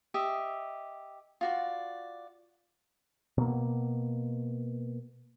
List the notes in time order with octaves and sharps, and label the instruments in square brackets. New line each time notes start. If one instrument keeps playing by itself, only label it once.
[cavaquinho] G4 D#5 E5
F4 F#4 D5
[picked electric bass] B2 A#3